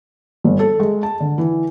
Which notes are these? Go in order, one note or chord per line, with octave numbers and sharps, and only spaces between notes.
G1
A4
G#3
A5
D3
E3